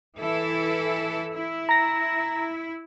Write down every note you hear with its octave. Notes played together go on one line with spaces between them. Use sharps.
E3 E4 A4
E4
A#5 A#6